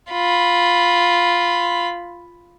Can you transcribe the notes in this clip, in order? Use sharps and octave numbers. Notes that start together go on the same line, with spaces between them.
F4 B5